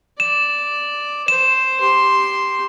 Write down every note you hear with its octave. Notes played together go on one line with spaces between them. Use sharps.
D5 E7
C5 E7
G4 C6